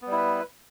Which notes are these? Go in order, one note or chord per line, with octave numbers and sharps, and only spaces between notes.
G3 B3 E4 B4